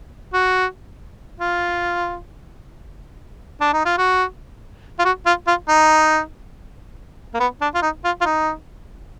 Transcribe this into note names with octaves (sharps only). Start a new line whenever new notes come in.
F#4
F4
D4
D#4
F4
F#4
F4
F#4
F4
F4
D#4
A#3
B3
D4
F4
D#4
F4
F4
D#4